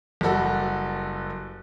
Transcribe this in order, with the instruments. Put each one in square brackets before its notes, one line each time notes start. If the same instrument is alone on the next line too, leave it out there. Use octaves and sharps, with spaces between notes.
[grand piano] F#1 G3 F#4 A4